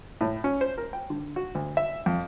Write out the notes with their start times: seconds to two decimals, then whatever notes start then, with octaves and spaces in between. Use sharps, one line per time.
0.21 A2
0.44 C#4
0.61 C5
0.78 A#4
0.93 G5
1.10 D3
1.36 F#4
1.55 D2
1.77 E5
2.06 F2